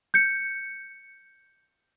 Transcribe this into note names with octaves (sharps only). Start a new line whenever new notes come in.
G6 C#7